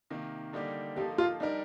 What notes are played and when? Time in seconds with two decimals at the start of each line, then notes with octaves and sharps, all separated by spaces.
0.10 C3 D#3 A#3
0.53 D3 G3 A#3 D#4 G4
0.96 F3 A#3 D#4 G4 A4
1.18 F4
1.40 G3 D4 D#4 G4 A#4